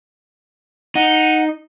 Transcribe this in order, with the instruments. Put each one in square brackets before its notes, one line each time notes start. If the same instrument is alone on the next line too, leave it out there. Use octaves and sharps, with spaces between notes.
[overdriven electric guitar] D#4 [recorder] F#5